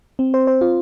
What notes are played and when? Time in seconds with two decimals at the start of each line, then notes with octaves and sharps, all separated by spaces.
0.19 C4
0.34 C5
0.47 C5
0.61 F4